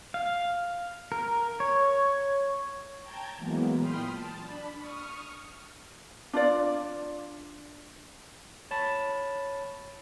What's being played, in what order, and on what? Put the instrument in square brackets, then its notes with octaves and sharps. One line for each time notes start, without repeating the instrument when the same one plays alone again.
[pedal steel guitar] F5
A#4
C#5
[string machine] G5 A5 A#5 G6 G#6
E3 F#3 G#3 A#3 B3
A#2 G5 B5 C6 D#6 F6
A5
D4 B5
C#6 D#6 F6
[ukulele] D4 F4 D5
[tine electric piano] C#5 A5 B5